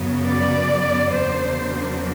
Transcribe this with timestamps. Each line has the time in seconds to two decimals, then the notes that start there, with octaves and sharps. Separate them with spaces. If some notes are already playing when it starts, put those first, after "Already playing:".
Already playing: F#2 C#3 F#3 B3
0.27 D5
1.11 E2 C#3 F#3 A#3 D4 C5